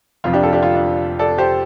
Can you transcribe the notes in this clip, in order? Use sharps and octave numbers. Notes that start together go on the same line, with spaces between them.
F1 F2 F3 F4
D4 G4
F4 A4
D4 G4
F4
D4
A4 D5
G4 C5